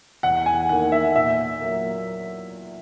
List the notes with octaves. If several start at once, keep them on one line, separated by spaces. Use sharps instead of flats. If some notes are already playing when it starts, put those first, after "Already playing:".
E2 F#5
G#5
D#3 A#3 F#5
E5
A#2 E5
F#3 A#3